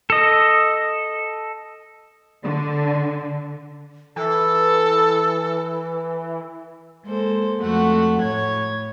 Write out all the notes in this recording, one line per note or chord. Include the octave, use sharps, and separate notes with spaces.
A4 D#5
D3
E3 A4
G#3 A#3 A4 C5
F2 A3 F#4 F#5
A2 C#5 G#6